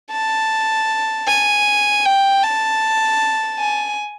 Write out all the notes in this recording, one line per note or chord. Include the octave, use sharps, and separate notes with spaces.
A5
G#5
G5
A5
G#5